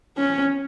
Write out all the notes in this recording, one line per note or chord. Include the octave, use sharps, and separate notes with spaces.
C#4